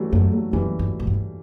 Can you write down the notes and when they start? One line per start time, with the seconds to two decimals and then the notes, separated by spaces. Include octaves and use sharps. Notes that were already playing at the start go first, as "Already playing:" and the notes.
Already playing: E3 F#3 G3 A3
0.12 F#2 F#3 A3
0.33 F#3 A3
0.53 F#2 E3 G3
0.79 G2
1.00 A2
1.07 G2